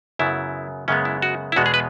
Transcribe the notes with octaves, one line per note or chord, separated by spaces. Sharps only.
F#2 C#3 F#3 B3 E4
F#2 C#3 G#3 B3 C#4
E4
F#4
E4
E2 B2 G#3 B3 F#4
G#4
B4